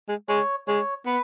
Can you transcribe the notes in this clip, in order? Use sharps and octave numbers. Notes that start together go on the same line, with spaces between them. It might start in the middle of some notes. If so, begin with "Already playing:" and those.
G#3
G#3 C#5
G#3 C#5
B3 B4